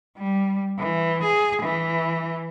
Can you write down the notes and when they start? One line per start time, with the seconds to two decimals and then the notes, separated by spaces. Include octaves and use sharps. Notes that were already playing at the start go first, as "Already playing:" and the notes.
0.18 G3
0.78 E3
1.23 G#4
1.63 E3